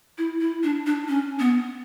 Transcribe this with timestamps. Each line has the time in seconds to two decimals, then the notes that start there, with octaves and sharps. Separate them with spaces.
0.18 E4
0.41 E4
0.63 D4
0.86 D4
1.09 C#4
1.40 B3